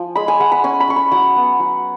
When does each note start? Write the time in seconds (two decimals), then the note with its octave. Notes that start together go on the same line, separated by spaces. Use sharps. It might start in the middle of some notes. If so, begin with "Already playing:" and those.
Already playing: F3 G#5
0.15 G#3 B5
0.28 G#5
0.40 G#3 F#5
0.52 B5
0.64 C#4 G#5
0.80 B5
0.88 C#4 C#6
0.96 B5
1.11 F#3 F#5
1.36 B3
1.60 F#3